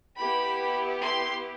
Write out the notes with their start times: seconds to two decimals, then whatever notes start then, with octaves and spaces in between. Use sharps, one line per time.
0.17 B3 E4 G4 B5
0.99 C6